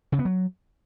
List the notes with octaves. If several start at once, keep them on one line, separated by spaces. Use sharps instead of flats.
C#3
B3
F#3